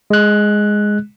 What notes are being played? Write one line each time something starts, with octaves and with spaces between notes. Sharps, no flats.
G#3 F#6